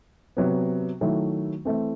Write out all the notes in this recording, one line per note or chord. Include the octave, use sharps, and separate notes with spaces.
C3 F#3 B3
D#3 F#3 A3 E4
E3 A3 C4 E4